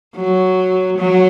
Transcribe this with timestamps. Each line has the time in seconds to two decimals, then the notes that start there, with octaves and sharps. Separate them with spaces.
0.16 F#3
0.98 F#3